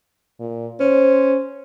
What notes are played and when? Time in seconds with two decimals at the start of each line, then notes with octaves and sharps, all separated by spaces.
0.39 A#2
0.80 C#4 C5